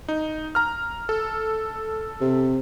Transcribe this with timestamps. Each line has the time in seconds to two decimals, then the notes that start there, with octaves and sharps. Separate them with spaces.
0.08 D#4
0.55 A#5 F6
1.09 A4
2.21 C3